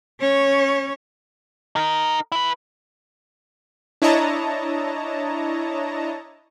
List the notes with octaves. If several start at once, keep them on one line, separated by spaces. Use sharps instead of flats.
C#4 C#5
D#4 A#4
E4 B4
D4 E4 C#5 D#5 A5 A#5